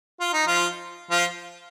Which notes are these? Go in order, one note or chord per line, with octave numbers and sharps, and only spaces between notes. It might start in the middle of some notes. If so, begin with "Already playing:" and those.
F4
D#4
F3 F4
F3 F4